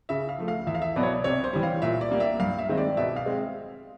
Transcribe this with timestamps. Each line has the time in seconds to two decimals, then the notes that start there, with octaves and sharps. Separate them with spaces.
0.09 C#3 E5
0.29 F5
0.38 F3 A3
0.48 F5
0.67 E2 E5
0.75 F5
0.82 E5
0.96 B2 F#3 B3 D5
1.03 C#5
1.11 D5
1.24 C3 C#5
1.44 C5
1.53 E3 G3
1.63 F5
1.82 A#2 E5
2.01 D5
2.11 G3 A#3
2.20 E5
2.40 G2 F5
2.59 E5
2.69 D#3 G#3 C4 D#4
2.77 D5
2.97 B2 E5
3.16 F5
3.26 G#3 C4